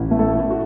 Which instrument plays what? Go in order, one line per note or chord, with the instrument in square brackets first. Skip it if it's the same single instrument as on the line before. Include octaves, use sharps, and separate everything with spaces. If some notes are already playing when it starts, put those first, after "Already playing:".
Already playing: [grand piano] A1
A3
A4
A2
F#4